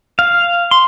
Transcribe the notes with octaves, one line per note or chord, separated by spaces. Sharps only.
F5
C6